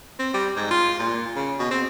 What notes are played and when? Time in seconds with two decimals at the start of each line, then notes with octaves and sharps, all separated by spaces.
0.19 C4
0.34 G3
0.57 G#2
0.71 F4
0.99 A#2
1.36 C#3
1.59 B2
1.71 C4